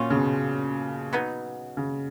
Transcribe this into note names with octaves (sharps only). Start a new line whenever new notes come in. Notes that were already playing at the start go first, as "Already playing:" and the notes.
Already playing: A#2 F#3 C#4 F4
C#3
B2
F#3 B3 D#4
C#3